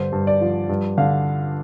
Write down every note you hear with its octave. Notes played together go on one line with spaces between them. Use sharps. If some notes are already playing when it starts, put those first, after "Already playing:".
Already playing: G2 D3 C5
G2
D5
F3
G2
D3 F5